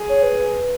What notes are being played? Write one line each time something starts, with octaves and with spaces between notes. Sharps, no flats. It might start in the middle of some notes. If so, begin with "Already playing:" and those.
Already playing: G#4
C#5
B4